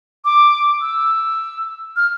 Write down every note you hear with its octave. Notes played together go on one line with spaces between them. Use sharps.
D6
E6
F6